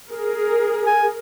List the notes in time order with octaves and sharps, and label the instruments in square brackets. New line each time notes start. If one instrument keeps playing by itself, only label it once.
[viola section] G#4 A#4
[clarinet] G#5